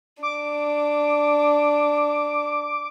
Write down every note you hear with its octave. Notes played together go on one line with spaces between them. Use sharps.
D4 D6